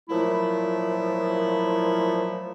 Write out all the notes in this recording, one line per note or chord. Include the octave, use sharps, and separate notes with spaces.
A#2 F3 F#3 A3 E4